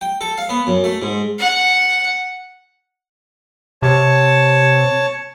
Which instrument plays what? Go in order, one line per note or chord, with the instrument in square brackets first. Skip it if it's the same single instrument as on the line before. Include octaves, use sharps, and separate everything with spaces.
[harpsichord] G5
A4
F5
B3
F#2
A3
G#2
[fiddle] F#5
[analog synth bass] C3 [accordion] C#5 A5